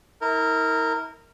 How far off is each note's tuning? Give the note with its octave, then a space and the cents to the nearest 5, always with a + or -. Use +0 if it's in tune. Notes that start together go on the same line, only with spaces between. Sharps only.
E4 -40 A#4 -15